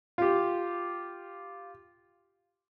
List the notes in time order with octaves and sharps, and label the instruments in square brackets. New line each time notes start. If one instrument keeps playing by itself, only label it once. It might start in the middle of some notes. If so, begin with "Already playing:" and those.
[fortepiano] F4 G4